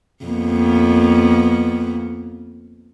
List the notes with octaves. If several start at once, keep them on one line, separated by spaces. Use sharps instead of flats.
F2 A#3 B3